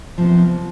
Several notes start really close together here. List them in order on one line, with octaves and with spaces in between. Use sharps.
F3 C3 B3